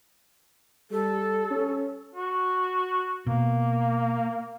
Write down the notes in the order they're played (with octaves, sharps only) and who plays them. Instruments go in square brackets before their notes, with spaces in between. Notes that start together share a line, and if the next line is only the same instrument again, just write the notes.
[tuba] G3 [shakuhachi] A4
[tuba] C#4
[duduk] F#4
[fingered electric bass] B2 [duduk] A#3